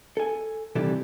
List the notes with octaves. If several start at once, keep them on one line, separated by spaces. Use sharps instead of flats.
A4 G#5
C3 D#3 E3 G3 A4